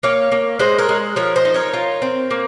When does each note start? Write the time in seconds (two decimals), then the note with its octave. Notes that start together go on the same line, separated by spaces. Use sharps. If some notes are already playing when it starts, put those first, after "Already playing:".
0.03 A#3 C#5 F5
0.32 A#3
0.59 G#3 C5 D#5
0.78 A#4 C#5
0.89 G#3
1.16 F3 A#4 C#5
1.36 C5 D#5
1.45 D#4
1.54 A#4 C#5
1.74 F4
2.02 C4
2.31 A#3